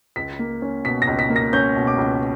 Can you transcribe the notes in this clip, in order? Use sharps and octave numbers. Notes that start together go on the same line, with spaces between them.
C#2 B6
A#3
C#4
B2 B6
A#6
C#2
B6
A#3
A#6
C#4 G6
B2
D6
C#2